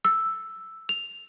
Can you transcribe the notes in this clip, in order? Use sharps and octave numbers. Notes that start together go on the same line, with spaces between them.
E6
F7